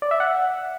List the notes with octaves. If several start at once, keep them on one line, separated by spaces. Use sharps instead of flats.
D5
E5
F#5